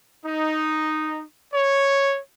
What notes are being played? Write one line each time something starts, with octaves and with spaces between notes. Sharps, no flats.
D#4
C#5